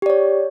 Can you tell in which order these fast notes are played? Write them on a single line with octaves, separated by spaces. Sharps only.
G4 D5 C#5